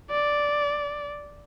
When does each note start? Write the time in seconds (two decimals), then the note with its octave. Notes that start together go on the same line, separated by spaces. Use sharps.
0.11 D5